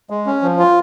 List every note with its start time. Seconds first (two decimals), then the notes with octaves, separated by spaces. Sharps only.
0.10 G#3
0.26 C#4
0.42 F3
0.59 F4